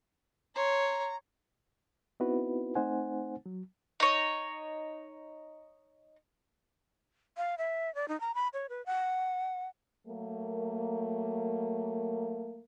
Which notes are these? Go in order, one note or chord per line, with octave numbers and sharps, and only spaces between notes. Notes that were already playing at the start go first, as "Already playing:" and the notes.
C#5 A#5 C6
B3 C4 D#4 E4 F#4 B4
A3 C4 D#4 C5 F#5 G#5
F#3
D#4 C#5
F5
E5
D5
D#4
A#5
B5
C#5
B4
F#5
F#3 A3 A#3